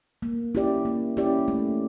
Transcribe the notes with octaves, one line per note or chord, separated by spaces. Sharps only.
A#3
C#4 E4 G4 D5
A#3
C#4 E4 G4 D5
A3